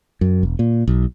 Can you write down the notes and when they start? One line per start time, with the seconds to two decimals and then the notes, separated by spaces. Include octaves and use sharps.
0.21 F#2
0.43 E1
0.59 A#2
0.88 B1